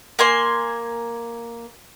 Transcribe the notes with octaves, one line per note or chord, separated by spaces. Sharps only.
A#3 G#5 C6